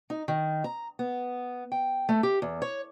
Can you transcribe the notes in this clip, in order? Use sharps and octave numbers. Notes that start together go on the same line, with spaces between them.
D#4
D#3
A#5
B3
G5
A3
G4
E2
C#5